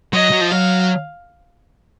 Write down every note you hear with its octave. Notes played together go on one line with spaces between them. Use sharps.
F#3 D#5
F#3
F3
F#3 F5